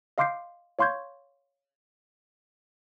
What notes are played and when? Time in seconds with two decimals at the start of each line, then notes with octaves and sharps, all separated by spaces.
0.18 D#5 F5 C6 D6 G6 C7
0.79 C#5 F5 C6 C#6 G6 G#6